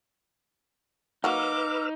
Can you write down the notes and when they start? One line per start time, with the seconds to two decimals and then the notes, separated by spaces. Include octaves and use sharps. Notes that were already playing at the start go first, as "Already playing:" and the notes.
1.24 F#3 A#3 D#4 F#4 B4 D6 E6 F6